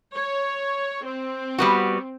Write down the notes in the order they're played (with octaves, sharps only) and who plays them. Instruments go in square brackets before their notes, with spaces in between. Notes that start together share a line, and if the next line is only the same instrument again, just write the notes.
[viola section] C#5
C4
[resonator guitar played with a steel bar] G3 B3 F#4